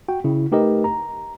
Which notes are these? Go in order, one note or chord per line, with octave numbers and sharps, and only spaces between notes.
F#4 G5
C#3 E4
A3 D#4 G4 A#4 B4 D#5
A#5